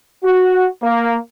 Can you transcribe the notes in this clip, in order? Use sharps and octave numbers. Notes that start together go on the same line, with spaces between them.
F#4
A#3